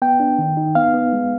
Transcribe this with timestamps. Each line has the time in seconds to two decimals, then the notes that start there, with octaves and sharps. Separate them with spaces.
0.02 B3 G5
0.20 D4
0.39 D#3
0.57 D#4
0.75 B3 F5
0.94 B3
1.13 G#3